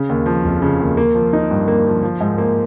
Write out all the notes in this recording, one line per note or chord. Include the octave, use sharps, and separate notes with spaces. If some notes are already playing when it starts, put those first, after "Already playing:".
Already playing: C#3
D#2
F3
F1
C#3
D#2
A#3
F3
D#4
G2
A#3
F3
F3
G#2
A#3